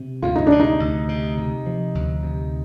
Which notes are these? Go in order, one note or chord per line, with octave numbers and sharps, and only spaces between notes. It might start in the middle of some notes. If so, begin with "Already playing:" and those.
Already playing: C3
D2 F4
D#4
D4
C3
D#4
D2
C3
C3
F3
D2
C3